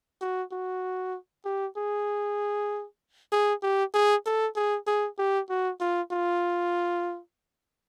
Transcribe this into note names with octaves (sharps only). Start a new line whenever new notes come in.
F#4
F#4
G4
G#4
G#4
G4
G#4
A4
G#4
G#4
G4
F#4
F4
F4